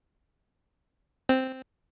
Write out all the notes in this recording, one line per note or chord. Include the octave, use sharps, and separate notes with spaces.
C4